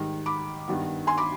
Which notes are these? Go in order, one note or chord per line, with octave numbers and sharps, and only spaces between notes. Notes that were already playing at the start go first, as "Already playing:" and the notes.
Already playing: G#2 D#3 G3
B5 D6
G2 D#3 B3
G#5 C6
B5 D6